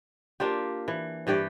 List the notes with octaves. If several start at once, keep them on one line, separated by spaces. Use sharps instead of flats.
A#3 D4 F4 G4
E3
G2 E3 G4 D5